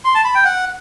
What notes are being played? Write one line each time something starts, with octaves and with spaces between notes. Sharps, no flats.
C6
A5
B5
G5
F#5